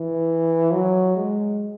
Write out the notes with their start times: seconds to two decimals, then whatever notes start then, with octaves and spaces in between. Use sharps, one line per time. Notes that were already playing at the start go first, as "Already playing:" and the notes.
Already playing: E3
0.72 F#3
1.16 G#3